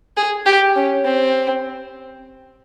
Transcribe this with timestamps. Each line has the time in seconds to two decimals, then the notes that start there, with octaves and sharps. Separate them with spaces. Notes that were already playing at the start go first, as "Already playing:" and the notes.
0.17 G#4
0.46 G4
0.76 C#4
1.05 C4